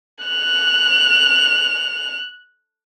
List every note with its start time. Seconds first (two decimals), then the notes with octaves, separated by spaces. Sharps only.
0.24 F#6 F7